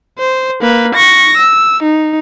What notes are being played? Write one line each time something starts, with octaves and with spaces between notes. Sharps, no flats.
C5
A#3 B4
C#6 A#6
E6
D#4